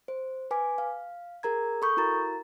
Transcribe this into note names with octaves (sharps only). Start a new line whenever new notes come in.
C5
B4 G#5 D6 B6
F5
G#4 A#4 A#5 G#6
A4 B5 C#6 D#6 G6
E4 F#4 A#4 A#5 A6